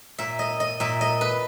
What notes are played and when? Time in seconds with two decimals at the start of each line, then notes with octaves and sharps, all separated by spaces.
0.18 A#2 E5
0.39 D#5
0.60 D#5
0.80 A#2 E5
1.01 D#5
1.21 B4